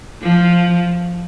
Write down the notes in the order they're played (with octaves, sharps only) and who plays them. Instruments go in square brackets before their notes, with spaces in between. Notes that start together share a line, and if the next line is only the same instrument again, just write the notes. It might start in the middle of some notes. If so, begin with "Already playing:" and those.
[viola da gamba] F3